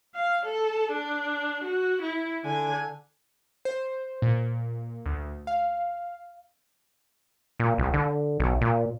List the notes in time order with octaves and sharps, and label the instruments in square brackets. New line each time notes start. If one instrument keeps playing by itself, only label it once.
[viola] F5
A4
D4
F#4
E4
D3 G#5
[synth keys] C5
A#2
D2
F5
[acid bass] A#2
C2
D3
B1
A#2